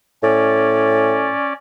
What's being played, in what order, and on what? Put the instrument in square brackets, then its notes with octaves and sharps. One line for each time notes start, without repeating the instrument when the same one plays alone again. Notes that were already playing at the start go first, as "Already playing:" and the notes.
[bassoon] A2 [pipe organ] C#4 D5